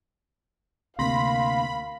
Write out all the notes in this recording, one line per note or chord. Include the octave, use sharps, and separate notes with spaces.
D2 C3 G3 A#3 F5 B5 C6 A#6